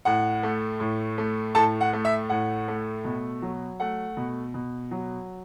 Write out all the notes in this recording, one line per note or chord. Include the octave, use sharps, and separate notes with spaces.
A2 F#5
A3
A2
A3
A2 A4 A5
F#5
A3
E5
A2 F#5
A3
B2
F#3
A3 F#5
B2
B2
F#3